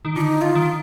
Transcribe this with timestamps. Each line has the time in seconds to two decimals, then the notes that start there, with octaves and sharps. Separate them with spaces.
0.05 D#3
0.16 D3 F4
0.21 D#4
0.42 F4
0.55 D#3